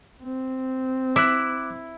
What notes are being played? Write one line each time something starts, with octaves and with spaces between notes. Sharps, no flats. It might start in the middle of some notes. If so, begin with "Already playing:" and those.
C4
E4 D6 F#6